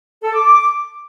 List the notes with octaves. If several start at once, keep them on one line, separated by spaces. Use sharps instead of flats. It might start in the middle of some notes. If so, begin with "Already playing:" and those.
A4
D6
D6